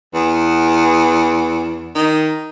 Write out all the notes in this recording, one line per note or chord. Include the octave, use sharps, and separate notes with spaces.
E2
D#3